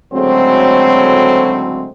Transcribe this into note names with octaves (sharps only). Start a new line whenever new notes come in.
D2 A2 C#3 F#3 G#3 C4